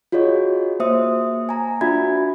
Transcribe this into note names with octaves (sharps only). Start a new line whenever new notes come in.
F4 F#4 G#4 C#5 D#5
A#3 C5 E5 D#6
G#5 A#5
D4 F4 F#4 E5 B5 G#6